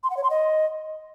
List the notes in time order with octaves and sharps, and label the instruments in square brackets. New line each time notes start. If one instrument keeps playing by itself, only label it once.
[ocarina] C6
F#5
C#5
C6
D#5